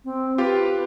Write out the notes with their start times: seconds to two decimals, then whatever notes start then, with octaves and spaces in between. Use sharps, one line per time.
0.04 C4
0.38 F4 G4 B4